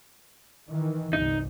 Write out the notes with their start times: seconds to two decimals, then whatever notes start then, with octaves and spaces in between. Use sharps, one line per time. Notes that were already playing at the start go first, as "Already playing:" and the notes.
0.68 D#3 E3
1.13 G1 C2 D#4